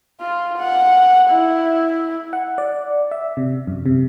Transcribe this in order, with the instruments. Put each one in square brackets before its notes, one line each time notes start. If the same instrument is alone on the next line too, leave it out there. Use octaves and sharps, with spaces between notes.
[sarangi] F4
F#5
E4
[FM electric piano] F#5
D5
E5
C3
F#2
C3